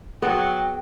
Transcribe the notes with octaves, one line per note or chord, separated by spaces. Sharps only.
F#3 B3 G#4 G5